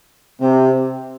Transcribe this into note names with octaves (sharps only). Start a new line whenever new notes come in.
C3